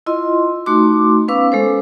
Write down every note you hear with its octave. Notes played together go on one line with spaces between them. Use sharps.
E4 F4 D#5 C6
A3 D#4 F#4 C6 D6
B3 C#4 B4 F5 D6 E6
G#3 A4 C5